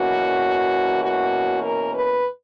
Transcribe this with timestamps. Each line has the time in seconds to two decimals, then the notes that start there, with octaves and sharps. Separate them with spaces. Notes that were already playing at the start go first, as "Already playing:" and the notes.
Already playing: E2 B2 A#3 C#4 F#4
1.03 F#4
1.63 A#4
1.93 B4